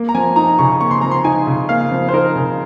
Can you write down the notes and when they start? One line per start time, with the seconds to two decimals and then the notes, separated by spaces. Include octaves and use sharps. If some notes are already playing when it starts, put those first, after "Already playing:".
Already playing: A#3
0.09 A#5
0.15 F3 G#5
0.36 D#4 A#5
0.59 C#3 C#6
0.81 A#3 C#6
0.91 C6
1.01 F3 A#5
1.11 C6
1.24 D#4 G#5
1.47 C#3
1.69 A#3 F5
1.91 F3
2.09 C5
2.13 D#4 A#4
2.36 C#3